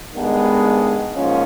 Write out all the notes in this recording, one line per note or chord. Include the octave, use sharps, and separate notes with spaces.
G2 D#3 G#3 B3
G#2 F3 A#3 C#4 F4